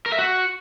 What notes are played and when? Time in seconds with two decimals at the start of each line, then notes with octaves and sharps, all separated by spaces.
0.06 A#4
0.12 E5
0.19 F#4